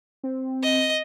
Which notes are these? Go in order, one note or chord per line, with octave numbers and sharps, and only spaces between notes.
C4
D#5